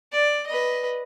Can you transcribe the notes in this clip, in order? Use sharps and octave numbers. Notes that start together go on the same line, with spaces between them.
D5
B4 D#5